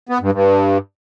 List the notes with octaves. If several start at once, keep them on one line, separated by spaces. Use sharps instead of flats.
B3
G2
G2